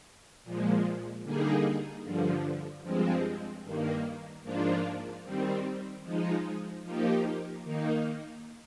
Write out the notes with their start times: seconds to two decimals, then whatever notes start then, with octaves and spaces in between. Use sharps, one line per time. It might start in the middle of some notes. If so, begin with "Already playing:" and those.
0.44 A#2 F3 G#3
1.24 D3 G3 A#3 D#4 G#4
2.04 G2 D3 F3
2.83 G2 F3 G#3 C4
3.63 G2 D#3 A#3
4.43 G#2 F3 A#3 D4 F4
5.24 D#3 G3 C4
6.04 F3 G#3 D#4
6.84 F3 A#3 D#4 G4
7.64 D#3 A#3 D#4